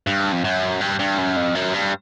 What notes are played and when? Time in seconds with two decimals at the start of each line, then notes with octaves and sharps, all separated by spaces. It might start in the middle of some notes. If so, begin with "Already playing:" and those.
0.07 G2
0.32 F2
0.44 F#2
0.81 G2
1.00 G2
1.18 F#2
1.37 F2
1.55 F#2
1.74 G2